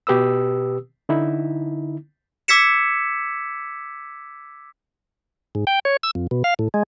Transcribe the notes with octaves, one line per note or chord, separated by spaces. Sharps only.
B2 G4 B4 D#6 E6
D3 D#4 E4
D6 E6 G#6 B6 C#7 E7
G#2
G5
C#5
E6
F2
B2
F5
A2
G#3